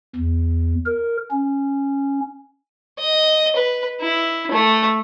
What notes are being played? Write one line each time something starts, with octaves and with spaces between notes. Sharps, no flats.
E2
A#4
C#4
D#5
B4
E4
A3